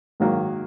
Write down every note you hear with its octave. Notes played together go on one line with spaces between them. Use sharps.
G#2 D#3 F#3 A#3